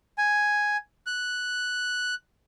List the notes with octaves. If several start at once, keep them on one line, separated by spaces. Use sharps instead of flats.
G#5
F#6